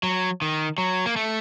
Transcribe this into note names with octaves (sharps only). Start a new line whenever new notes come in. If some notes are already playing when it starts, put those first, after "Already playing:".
F#3
D#3
F#3
A#3
A3